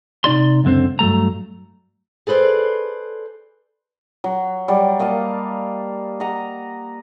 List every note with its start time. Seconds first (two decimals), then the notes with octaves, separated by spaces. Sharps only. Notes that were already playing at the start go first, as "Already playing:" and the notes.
0.24 C3 D#4 D5 C6
0.64 C#2 F#2 D3 C4 C5
0.99 G2 F#3 A3 A#5
2.27 G#4 A4 B4 C5 D5
4.24 F#3
4.68 F#3 G3 D5
4.99 A#3 D#5 F5 A5
6.20 D#5 F#5 A#5